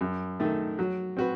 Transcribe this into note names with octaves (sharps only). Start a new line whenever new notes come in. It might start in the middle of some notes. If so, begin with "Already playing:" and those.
F#2
D#3 A3
F#3
C4 F#4 B4